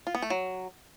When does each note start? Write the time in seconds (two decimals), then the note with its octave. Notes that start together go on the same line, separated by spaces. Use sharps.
0.07 F4
0.15 B3
0.22 A3
0.30 F#3